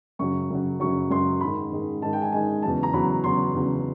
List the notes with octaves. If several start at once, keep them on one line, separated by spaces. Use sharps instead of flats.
F#2 C#3 F#3 C#6
F#2 C#3 F#3
F#2 C#3 F#3 C#6
F#2 C#3 F#3 C6
G#2 D#3 G#3 B5
G#2 D#3 G#3
G#2 D#3 G#3 A5
G5
G#5
G#2 D#3 G#3 G#5
E2 C#3 F#3 A5
A#5
E2 C#3 F#3 B5
E2 C#3 F#3 C6
E2 C#3 F#3